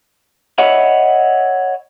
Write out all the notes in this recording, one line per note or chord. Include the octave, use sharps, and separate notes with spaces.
C#5 D#5 E5 F#5 B5